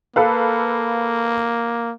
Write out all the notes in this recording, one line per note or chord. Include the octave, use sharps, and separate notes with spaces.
A#3 A4 B4 F5